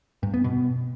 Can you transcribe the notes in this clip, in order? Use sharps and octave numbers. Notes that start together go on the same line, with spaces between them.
G2
B3
B2